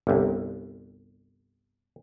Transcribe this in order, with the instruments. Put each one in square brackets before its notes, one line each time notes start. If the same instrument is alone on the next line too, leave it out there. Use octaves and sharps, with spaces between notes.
[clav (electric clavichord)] G1 C2